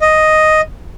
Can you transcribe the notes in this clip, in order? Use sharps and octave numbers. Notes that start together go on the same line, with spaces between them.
D#5